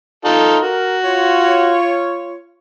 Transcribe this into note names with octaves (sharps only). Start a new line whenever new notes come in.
D#4 F4 A4
F#4 A#4
F4 C#5